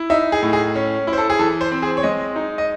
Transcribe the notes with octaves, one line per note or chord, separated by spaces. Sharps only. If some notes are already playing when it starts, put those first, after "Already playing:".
Already playing: E4
D#4 E5
G#4
A2
G#4
C#4
E4
C5
A4
G#4
E3 A4
C5
C4
G#4
C#5
G#3 D#5
D#4
D#5